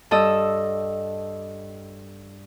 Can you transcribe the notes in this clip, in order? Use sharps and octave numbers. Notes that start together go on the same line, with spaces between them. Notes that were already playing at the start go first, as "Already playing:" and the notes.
G2 A4 D#5 E6